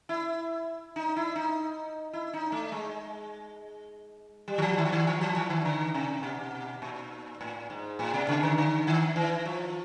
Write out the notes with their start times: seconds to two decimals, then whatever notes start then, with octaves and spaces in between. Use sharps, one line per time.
0.09 E4
0.96 D#4
1.16 E4
1.36 D#4
2.13 E4
2.33 D#4
2.52 A3
2.72 G#3
4.48 G3
4.58 E3
4.62 F3
4.78 D#3
4.85 E3
4.92 D#3
5.07 E3
5.21 F3
5.36 E3
5.50 D#3
5.65 D3
5.94 C3
6.23 B2
6.82 A#2
7.41 A2
7.70 G#2
7.99 A2
8.14 B2
8.28 C#3
8.43 D3
8.58 D3
8.87 D#3
9.16 E3
9.45 F3